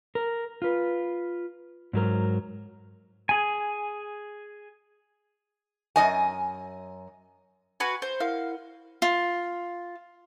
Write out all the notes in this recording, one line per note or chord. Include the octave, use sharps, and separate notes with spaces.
A#4
F4 B4
G#2 F#3 A#4
G#4 G#5
F#2 D#5 G#5
F#4 B4 G#5
C5
E4 A#4 F5 F#5
F4